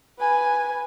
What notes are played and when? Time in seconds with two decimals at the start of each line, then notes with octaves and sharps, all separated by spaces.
0.19 B4 G#5